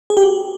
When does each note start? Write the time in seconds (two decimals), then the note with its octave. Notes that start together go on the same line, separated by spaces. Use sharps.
0.10 G#4
0.17 G4
0.23 F#4